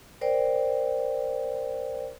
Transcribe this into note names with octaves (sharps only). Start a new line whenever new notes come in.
A#4 C5 D5 G5